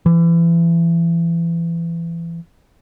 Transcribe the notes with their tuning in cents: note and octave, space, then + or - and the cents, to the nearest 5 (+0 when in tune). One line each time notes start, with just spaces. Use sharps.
E3 +30